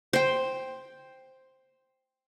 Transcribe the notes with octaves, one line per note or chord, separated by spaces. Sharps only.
C5 G5